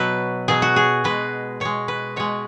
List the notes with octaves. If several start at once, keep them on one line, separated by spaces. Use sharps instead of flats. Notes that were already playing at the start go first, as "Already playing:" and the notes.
Already playing: B2 F#3 B4
B2 F#3 G#4
F#4
G#4
B2 G#3 B4
B2 G#3 C#5
B4
B2 G#3 C#5